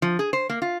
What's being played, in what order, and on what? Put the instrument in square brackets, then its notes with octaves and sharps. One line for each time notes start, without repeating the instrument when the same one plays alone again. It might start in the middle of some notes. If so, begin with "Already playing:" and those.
[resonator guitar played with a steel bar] F3
G#4
C5
A#3
F4